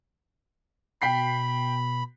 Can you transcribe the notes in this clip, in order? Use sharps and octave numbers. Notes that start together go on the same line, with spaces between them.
B2 G5 B5 B6 C7